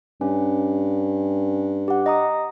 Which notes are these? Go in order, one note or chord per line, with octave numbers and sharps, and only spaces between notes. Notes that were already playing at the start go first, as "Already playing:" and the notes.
G2 C#4
G4 F#5
D#5 A#5 D#6